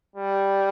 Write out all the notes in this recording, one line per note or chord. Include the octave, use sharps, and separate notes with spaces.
G3